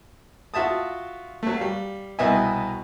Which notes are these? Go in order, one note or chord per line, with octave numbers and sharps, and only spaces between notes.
F4 F#4 E5 A5 D#6
F#3 A3
G3 F5
C2 B2 B4 D#5 E5 G#5